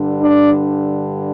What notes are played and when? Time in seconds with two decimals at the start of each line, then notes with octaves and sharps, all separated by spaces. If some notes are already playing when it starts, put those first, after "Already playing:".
Already playing: G2 D3
0.20 D4